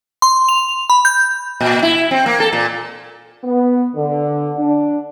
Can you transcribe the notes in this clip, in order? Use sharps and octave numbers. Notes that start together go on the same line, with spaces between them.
C6
F7
B5
G6
A#2
E4
C4
A#3
A4
A#2
B3
D3
D4